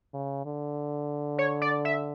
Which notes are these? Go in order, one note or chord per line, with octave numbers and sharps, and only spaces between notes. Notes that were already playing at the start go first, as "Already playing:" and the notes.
C#3
D3
C#5
D5
E5